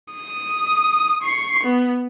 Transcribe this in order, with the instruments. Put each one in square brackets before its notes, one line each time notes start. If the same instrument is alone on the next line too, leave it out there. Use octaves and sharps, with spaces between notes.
[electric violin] D#6
C#6 C7
B3